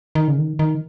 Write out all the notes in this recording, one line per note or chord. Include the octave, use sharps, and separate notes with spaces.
D#3
C#3
D#3
D#3